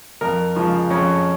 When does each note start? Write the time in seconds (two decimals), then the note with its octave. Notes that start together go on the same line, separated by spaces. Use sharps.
0.21 F2 A#4
0.55 C#3 F3 G#3
0.90 F2 C#4